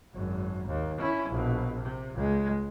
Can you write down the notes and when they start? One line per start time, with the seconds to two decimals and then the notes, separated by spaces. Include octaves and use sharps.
0.14 G#1 F#2
0.68 D#2
0.98 C#4 E4
1.30 A#1 B2
1.79 C3
2.15 C#2 G#3